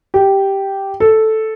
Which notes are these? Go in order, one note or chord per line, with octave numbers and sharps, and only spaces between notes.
G4
A4